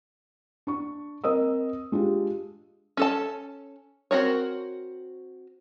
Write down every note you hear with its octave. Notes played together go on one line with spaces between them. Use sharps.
D4 C#6
C4 A#4 D#5 D#6 E6
G#3 D4 F4 G4
C#4 A4 A5
C4 F#4 A#4 C#5